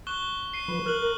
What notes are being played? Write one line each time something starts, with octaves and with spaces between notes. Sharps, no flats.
C#6 F#6 G7
C7 D#7
F3 B4
A#4 F6 F#6 F#7